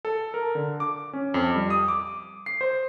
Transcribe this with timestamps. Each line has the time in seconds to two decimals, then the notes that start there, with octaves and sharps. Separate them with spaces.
0.05 A4
0.34 A#4
0.55 D3
0.80 D6
1.13 C#4
1.34 F2
1.55 G3
1.70 D#6
1.88 D6
2.46 C7
2.61 C5